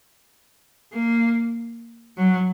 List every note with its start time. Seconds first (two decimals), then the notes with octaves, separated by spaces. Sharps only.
0.93 A#3
2.17 F#3